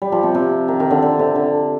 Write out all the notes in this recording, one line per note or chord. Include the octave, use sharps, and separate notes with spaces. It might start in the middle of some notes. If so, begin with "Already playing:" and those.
G3
F3
C3
C3
D#3
D#3
D3
D3
C3
D3